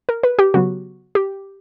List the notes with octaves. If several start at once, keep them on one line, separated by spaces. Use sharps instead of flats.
A#4
B4
G4
C#3 F#3 B3 F#4
G4